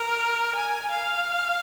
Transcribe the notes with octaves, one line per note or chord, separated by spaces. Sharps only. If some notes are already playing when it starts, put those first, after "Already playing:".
Already playing: A#4
G#5
F5